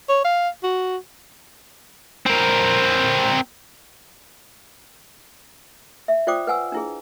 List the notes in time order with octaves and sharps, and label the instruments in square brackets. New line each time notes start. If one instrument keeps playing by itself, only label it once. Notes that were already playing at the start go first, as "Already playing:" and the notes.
[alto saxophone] C#5
F5
F#4
[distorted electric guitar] C4 A#4
[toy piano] E5
F4 C5 D5 G5 D6 D#6
B4 F#5 G#5 E6
D4 E4 G#4